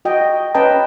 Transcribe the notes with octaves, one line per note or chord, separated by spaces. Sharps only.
F#4 D#5 G5
C#4 B4 D#5 G5 A5 A#5